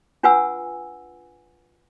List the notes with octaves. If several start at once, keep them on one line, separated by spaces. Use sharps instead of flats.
D4 F4 B4 F#5 G#5 E6